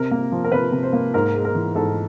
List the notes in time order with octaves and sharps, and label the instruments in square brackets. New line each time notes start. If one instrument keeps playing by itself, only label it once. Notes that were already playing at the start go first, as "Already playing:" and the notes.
Already playing: [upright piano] C3 A#4
A#3
F3
A#4
C3 B4
C3
C5
A#3
G#2 A#4
G#3
A#4
E3
G#2 A4